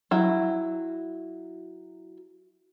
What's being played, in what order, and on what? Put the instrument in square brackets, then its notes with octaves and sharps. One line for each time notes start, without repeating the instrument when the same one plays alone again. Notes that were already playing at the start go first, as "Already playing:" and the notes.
[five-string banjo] F#3 E4